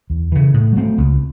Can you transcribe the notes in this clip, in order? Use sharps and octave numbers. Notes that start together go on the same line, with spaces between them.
E2
C#3 E3
A2
F#3 A3 C4
C#2